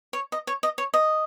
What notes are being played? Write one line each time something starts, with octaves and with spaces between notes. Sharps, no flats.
C#5
D#5
C#5
D#5
C#5
D#5